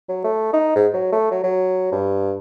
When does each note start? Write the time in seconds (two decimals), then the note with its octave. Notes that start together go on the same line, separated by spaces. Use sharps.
0.09 F#3
0.24 A3
0.53 D#4
0.76 G#2
0.94 F#3
1.12 A3
1.31 F#3
1.44 F#3
1.92 G2